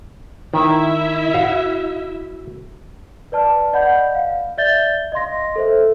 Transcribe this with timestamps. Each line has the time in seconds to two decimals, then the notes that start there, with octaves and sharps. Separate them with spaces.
0.54 D#3 E4 E5
1.34 F#4 F5
3.32 B4 D5 A5 F6
3.73 D5 D#5 F#5 B5 G6
4.15 F5
4.58 D5 E5 G6 A6 G7
5.12 D#5 F5 C6 A#6
5.56 A4 C5 E5